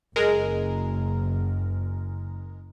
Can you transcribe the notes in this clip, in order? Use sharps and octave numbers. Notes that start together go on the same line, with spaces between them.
F#1 G#3 A#4